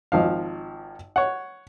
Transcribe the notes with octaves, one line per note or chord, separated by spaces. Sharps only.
G#1 F3 F5
C#5 F#5